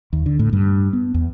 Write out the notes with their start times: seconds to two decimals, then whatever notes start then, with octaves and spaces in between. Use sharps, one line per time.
0.13 D#2
0.26 D3
0.39 A2
0.53 G2
0.93 B3
1.14 E2